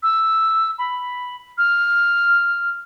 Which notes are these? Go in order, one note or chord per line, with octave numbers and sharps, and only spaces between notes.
E6
B5
F6